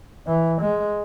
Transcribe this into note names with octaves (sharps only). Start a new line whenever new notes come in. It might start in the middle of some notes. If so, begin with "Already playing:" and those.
E3
G#3